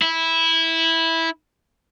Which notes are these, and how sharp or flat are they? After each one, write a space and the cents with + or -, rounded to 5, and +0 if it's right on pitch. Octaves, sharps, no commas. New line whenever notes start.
E4 -10